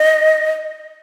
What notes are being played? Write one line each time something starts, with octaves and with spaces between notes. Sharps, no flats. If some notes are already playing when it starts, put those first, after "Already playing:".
Already playing: D#5